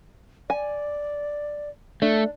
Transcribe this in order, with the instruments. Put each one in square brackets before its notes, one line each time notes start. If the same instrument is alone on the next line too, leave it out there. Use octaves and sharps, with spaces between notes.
[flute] D5 [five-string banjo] G#5
[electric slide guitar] A3 [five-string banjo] D4